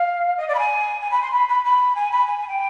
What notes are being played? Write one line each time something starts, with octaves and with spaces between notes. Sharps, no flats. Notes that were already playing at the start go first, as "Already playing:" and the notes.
Already playing: F5
D#5
D5
B5
G#5
G#5
B5
C6
B5
B5
B5
G#5
B5
G#5
G#5
G5